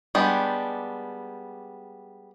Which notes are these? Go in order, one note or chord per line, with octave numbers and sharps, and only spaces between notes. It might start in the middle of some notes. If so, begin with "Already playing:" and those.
G3 G#3 B3 D4 G4